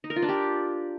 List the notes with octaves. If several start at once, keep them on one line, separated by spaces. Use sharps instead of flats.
D#4
A#4
F4
D4
G4